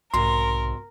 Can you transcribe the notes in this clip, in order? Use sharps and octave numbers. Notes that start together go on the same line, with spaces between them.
B1 G#2 C3 F#4 A#4 C6